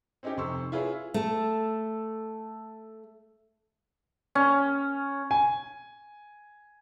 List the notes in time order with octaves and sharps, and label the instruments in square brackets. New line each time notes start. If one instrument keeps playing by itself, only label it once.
[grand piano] C4 C#4 D#4 E4 G4
F1 C3 C6 C#6 E6
E4 F4 G#4 B4 C#5 E5
[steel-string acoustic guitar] A3 A4
[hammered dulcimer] C#4
[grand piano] G#5